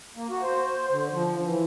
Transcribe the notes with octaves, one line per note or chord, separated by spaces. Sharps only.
A#3
F#4
C5
D3
F3
E3